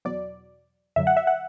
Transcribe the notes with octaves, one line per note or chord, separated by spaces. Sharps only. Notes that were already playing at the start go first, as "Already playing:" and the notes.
E2 B2 F#3 D5
F#2 D3 F#3 E5
F#5
E5
F#5